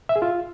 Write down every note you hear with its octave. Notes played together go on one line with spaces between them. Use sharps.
E5
G#4
F4